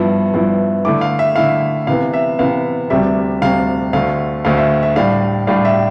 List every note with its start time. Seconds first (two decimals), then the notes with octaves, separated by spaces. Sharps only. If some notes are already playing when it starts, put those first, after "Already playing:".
Already playing: G2 F3 B3 E4
0.33 G2 F3 B3 E4
0.85 D3 A3 E4 D6
1.01 F5
1.19 E5
1.36 D3 A3 E4 F5
1.87 C3 E3 B3 F5
2.14 E5
2.39 C3 E3 B3 F5
2.90 D2 C3 G3 E5
3.42 D2 C3 G3 F5
3.93 D2 D3 A3 F5
4.45 D2 D3 A3 F5
4.57 E5
4.83 E5
4.96 A2 G3 D4 F5
5.47 A2 G3 D4 F5
5.65 E5